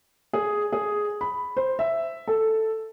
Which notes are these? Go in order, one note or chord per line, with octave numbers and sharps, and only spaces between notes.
G#4
G#4
B5
C5
E5
A4